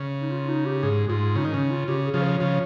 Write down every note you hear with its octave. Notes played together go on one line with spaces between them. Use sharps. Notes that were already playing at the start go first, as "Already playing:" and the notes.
Already playing: C#3
D#4
F4
D#4
G4
G#2 G#4
G#2 F4
C#3 D#4
D#3
C#3 C#4
F4
C#3 G4
G4
G#4
C#3 F3
C#5
C#3 F3